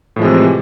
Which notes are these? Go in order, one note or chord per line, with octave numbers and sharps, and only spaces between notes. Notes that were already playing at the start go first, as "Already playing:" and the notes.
A2 C3 E3 F3 G#3